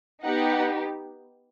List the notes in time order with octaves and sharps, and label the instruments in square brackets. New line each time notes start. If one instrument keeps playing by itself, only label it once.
[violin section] B3 D#4 G4 F#5